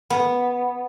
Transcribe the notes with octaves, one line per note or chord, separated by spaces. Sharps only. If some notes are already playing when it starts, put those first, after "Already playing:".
B3